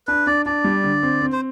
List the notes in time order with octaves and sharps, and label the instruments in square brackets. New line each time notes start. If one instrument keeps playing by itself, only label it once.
[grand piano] D4 [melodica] B4
[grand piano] D4 [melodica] D5
[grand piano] D4 [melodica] D5
[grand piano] G3
D3
C4
C4
[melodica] C5